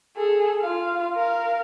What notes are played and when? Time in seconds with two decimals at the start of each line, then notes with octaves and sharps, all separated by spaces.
0.17 G#4 A4
0.61 F4 F5
1.16 A#4 F5